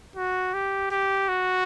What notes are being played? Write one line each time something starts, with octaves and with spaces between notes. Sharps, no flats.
F#4
G4
G4
F#4